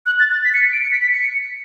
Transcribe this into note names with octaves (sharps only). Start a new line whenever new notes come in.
F#6
A6
A6
B6
C#7
D7
C#7
B6
B6
C#7